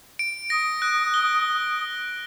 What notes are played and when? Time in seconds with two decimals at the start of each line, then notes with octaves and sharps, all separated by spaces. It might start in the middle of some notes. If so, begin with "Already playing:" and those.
0.19 D7
0.50 D#6 A#6
0.82 F#6
1.14 G7